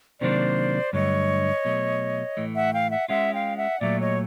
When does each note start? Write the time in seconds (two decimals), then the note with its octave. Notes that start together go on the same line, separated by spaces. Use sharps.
0.21 C3 D#3 F#3 A#3 D4 C5 D5
0.93 G2 D3 F#3 A3 C#5 D#5
1.65 B2 F#3 A3
2.37 A2 E3 A3
2.55 E5 F#5
2.73 F5 G5
2.90 E5 F#5
3.08 G#3 C#4 F4 E5 F#5
3.33 F5 G5
3.57 E5 F#5
3.81 A#2 F#3 A3 D5 E5
3.99 C#5 D#5